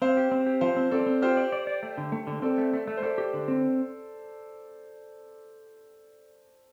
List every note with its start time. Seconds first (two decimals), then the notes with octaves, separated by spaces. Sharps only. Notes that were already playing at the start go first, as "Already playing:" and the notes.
0.02 C4 C5 F5
0.17 G4
0.32 C4
0.46 G4
0.61 F3 C5 F5
0.77 C4
0.91 C4 A4 D5
1.06 C4
1.22 F4 G4 C5
1.37 D5
1.52 D5
1.67 D5
1.83 A3
1.98 D3
2.12 A3
2.27 D3
2.42 C4 A4 D5
2.58 A3
2.73 A3
2.87 A3
2.97 C5
3.02 A3 A4 D5
3.18 G4
3.34 D3
3.48 C4